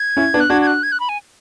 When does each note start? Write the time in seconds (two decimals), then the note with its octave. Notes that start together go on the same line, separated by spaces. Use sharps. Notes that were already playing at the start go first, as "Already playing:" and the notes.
Already playing: G#6
0.17 C#4 E4
0.34 B3 D4
0.40 F#6
0.50 D4 F#4 G#6
0.62 G#6
0.67 F#6
0.83 G#6
0.92 F#6
1.00 B5
1.09 G#5